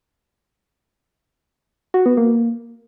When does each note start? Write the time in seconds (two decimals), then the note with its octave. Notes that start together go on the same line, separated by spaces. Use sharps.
1.94 F#4
2.06 B3
2.17 A#3